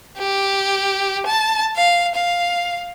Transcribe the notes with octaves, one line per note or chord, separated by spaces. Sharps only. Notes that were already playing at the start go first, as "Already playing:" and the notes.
G4
A5
F5
F5